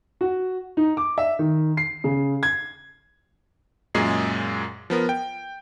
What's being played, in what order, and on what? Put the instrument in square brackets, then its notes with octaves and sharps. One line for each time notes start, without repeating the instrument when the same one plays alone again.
[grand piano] F#4
D#4
D6
E5
D#3
C7
C#3
G#6
[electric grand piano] F#2 A#2 G#3 G#4 C7
F3 B3 A#4
G5